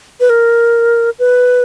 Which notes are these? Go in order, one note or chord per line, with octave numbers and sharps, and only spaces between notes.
B4
A#4
B4